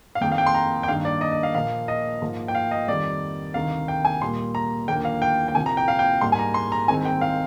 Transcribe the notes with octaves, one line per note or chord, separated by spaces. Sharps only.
F5
F2 D#3 A#3 G5
F5
G5
C6
A#5
G5
G2 D#3 A#3 F5
D5
D#5
D#5
F5
A#2 F3 A#3 F5
D#5
G#2 F3 A#3
G5
F5
D#5
F2 D#3 G3 D5
D2 C3 D#3 F5
G5
G#5
A#2 G3 A#3 C6
A#5
D#2 D3 F3 A#3 G5
F5
G5
G5
C2 C3 F3 G#5
A#5
G5
F5
G5
G#2 G3 A#3 C6
G#5
A#5
C6
A#5
C2 C3 D#3 G#3 C4 G#5
G5
F5